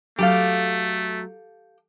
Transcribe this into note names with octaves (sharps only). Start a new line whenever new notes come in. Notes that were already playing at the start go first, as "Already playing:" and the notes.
F#3 A3 G4 A4 F5